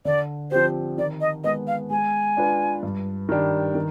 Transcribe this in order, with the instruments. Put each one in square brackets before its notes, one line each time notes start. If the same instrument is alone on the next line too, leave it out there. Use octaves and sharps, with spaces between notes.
[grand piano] D3 [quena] D5
[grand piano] F3 C4 G4 [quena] C5
[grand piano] D#3 [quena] D5
[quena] D#5
[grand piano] G#3 B3 [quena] D#5
[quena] F5
[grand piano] G#3 [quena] G#5
[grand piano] D4 F4 B4
G2
D#3 G3 D4 G4
D#3